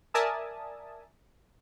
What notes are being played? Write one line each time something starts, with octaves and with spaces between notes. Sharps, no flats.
A#4 D5 E5 G#5 A5 D#6